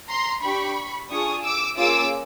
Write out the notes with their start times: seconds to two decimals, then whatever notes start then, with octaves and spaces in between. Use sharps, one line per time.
0.09 A#5 C6
0.42 D4 G4 B5 C#6
1.09 D4 F4 G#4 C#6 D#6
1.43 D6 E6
1.77 A#3 C#4 F4 G#4 D6 E6